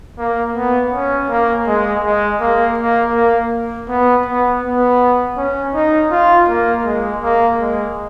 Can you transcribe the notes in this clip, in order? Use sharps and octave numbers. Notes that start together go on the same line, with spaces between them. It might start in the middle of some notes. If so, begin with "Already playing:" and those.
A#3
B3
C#4
A#3
G#3
G#3
A#3
A#3
A#3
B3
B3
B3
C#4
D#4
F4
A#3
G#3
A#3
G#3